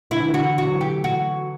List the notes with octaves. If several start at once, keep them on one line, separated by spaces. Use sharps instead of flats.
D3 E4
E3
D3
F#4
D3
F#4
F#3
E3
G4
F#4